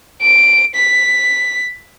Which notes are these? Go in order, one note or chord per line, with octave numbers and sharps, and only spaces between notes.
D7
B6